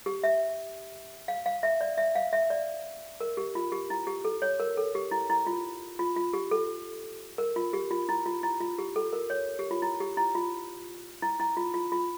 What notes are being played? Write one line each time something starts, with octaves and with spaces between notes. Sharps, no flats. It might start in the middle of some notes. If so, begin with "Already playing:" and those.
G4
E5
F5
F5
E5
D5
E5
F5
E5
D5
A#4
G4
F4
G4
E4
G4
A4
C#5
A#4
A4
G4
E4
E4
F4
F4
F4
G4
A4
A#4
F4
G4
F4
E4
F4
E4
F4
G4
A4
A#4
C#5
G4
F4
E4
G4
E4
F4
E4
E4
F4
F4
F4